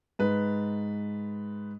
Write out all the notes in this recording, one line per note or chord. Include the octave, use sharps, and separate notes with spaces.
G#2 B4